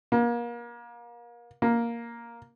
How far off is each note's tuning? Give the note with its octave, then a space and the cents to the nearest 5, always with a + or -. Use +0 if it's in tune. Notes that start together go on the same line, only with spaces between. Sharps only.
A#3 +30
A#3 +0